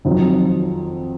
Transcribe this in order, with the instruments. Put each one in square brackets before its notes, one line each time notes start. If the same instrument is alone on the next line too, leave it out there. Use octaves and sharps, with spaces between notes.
[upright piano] F2 D#3 F#3